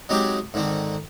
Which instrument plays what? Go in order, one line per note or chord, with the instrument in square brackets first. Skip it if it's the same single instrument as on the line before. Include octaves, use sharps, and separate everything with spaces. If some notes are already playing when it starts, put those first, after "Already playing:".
[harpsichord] F#3 G#3 C4 D#4 G4 G#4
G#2 D3 D#3 C4